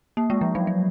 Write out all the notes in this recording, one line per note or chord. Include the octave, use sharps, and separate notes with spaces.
A#3
G#3
F3
F#3
F#3